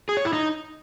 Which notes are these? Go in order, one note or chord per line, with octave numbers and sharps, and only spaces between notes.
G#4
C#5
E4
D#4